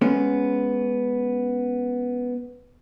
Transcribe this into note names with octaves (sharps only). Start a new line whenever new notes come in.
G#3 B3 C#4